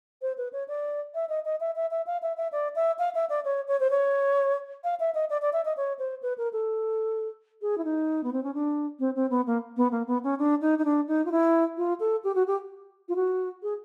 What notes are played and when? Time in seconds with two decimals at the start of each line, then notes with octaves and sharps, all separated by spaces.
0.22 C5
0.38 B4
0.53 C#5
0.68 D5
1.15 E5
1.29 D#5
1.45 D#5
1.60 E5
1.76 E5
1.91 E5
2.07 F5
2.22 E5
2.37 E5
2.52 D5
2.76 E5
2.99 F5
3.15 E5
3.30 D5
3.45 C#5
3.68 C#5
3.80 C5
3.90 C#5
4.84 F5
5.00 E5
5.15 D#5
5.30 D5
5.42 D5
5.53 E5
5.65 D#5
5.77 C#5
5.99 C5
6.23 B4
6.38 A#4
6.53 A4
7.62 G#4
7.78 E4
7.84 D#4
8.24 B3
8.33 C4
8.44 C#4
8.54 D4
9.00 C4
9.16 C4
9.30 B3
9.47 A#3
9.77 B3
9.92 A#3
10.07 B3
10.24 C#4
10.39 D4
10.61 D#4
10.78 D#4
10.85 D4
11.08 D#4
11.25 F4
11.32 E4
11.78 F4
12.00 A4
12.24 G4
12.35 F#4
12.47 G4
13.09 F4
13.16 F#4
13.63 G#4